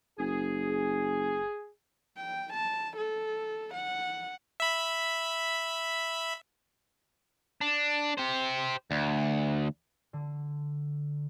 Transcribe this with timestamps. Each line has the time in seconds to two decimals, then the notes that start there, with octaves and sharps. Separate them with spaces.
0.19 F#1 G#4
2.17 G5
2.53 A5
2.97 A4
3.74 F#5
4.60 E5 B5
7.61 D4
8.18 G4 C5
8.91 D2
10.13 D3